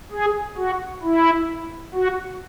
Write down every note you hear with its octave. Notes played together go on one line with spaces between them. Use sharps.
G#4
F#4
E4
F#4